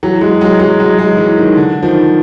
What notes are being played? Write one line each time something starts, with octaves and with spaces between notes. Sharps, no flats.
E3 F#3
F#3 G#3
F#3 G#3
F#3 G#3
F#3 G#3
F#3 G#3
E3 F#3
D#3
D3
D#3 F3